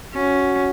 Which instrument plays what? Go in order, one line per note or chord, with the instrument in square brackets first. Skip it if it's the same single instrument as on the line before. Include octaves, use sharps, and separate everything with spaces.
[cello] C#4 [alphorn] F#4